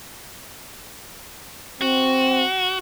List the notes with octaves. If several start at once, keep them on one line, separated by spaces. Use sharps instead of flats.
C4 F#4